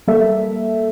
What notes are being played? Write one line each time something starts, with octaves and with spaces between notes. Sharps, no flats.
G3 A#3 A4 E5